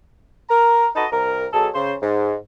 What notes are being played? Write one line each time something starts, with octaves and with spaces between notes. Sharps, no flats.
A#4 A#5
D#4 F#4 A4 B4 D#5 A5
C2 A#4
B2 F#3 G#4 A4
C#3 C5
G#2